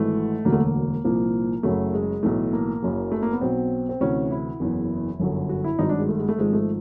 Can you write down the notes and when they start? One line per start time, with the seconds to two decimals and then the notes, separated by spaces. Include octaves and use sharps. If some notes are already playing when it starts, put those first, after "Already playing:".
Already playing: G#1 G#2 E3 A3
0.45 E1 D2 D3 F#3 A#3
0.52 A3
0.59 A#3
1.05 C2 A#2 F3 A#3
1.63 F#1 F#2 C#3 F#3 A3
1.93 G#3
2.23 B1 A2 E3 A3
2.53 A#3
2.82 F#1 F#2 C#3 F#3
3.12 A3
3.22 A#3
3.32 B3
3.41 B1 B2 F#3 C4
3.89 C4
4.01 D2 C3 E3 C#4
4.31 E4
4.60 F#1 E2 C#3 E3
5.20 G1 F#2 D3 F#3
5.49 F#4
5.64 E4
5.79 G#1 G2 D#3 F#3 D#4
5.89 D4
5.99 G#3
6.09 A3
6.19 G#3
6.29 A3
6.38 G#1 G#2 F3 G#3
6.53 A3